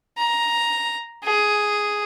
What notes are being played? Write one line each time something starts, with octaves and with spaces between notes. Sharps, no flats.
A#5
G#4